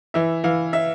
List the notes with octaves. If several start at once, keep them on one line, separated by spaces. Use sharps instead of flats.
E3 E5
E3 F5
E5